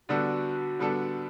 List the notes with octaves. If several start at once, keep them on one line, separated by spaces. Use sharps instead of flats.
D3 G3 B3 D4 F#4 A4
D3 G3 B3 D4 A4